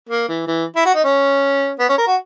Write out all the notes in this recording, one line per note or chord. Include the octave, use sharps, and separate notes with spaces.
A#3
E3
E3
E4
F#4
D#4
C#4
B3
C#4
A#4
F#4